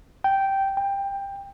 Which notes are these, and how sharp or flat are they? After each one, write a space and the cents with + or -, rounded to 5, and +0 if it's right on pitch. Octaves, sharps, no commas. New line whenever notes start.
G5 -10
G5 +15